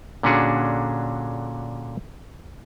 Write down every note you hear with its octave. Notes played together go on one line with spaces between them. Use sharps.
A#2 D3 C#4 D4 F#4 G#4